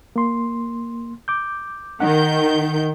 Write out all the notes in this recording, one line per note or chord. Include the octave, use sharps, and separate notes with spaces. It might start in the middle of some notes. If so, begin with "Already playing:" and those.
A#3 C6
D6 G6
D#3 F#5 G6